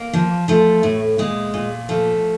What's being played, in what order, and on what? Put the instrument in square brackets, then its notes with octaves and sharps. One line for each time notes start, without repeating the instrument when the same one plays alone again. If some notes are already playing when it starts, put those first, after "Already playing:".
Already playing: [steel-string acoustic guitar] A#3
F3
F3 A3
A2
A#2 G#3
A#2
F3 A3